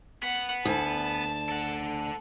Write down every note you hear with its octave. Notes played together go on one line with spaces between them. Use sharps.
B3 F#5
D2 A5
A4 F#5